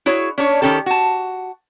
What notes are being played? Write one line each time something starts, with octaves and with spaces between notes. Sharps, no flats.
E4 F#4 G#4 C#5
C#4 D4 C#5
D#3 E3 C#4 G4 A4
F#4 A5